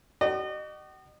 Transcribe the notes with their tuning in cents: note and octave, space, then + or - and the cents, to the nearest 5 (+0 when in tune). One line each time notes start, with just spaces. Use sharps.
F#4 +45 D#5 -35